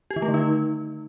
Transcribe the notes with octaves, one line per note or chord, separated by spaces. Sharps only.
G4
D#3
A3
D3
D#4